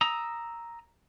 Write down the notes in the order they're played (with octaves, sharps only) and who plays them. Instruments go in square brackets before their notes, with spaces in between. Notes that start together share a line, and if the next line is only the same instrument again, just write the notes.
[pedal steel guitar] A#5 D#6 E6